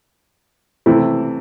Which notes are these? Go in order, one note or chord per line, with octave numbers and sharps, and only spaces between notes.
C3 E3 A3 C4 E4